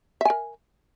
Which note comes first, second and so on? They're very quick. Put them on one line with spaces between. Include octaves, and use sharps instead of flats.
E5 G#5 A#4